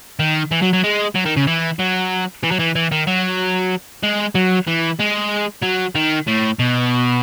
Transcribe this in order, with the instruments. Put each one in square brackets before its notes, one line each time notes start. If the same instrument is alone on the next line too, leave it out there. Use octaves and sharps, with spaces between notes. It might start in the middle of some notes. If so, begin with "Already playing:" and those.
[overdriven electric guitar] D#3
E3
F#3
F#3
G#3
F#3
D#3
C#3
E3
F#3
E3
F#3
E3
E3
D#3
F#3
G#3
F#3
E3
G#3
F#3
D#3
A2
B2